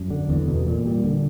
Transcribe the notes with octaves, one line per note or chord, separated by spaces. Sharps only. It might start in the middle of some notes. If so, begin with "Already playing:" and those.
Already playing: F#2
D3
E2
B2
A#2
G3
D3